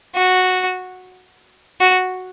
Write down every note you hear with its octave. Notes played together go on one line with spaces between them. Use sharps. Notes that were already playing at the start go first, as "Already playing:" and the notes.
F#4
F#4